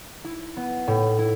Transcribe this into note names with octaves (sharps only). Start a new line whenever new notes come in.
E4
B3
A2
E4